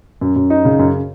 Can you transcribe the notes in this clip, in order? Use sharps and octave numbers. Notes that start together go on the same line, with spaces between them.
F#2
F#2
D#4
C#3
F#2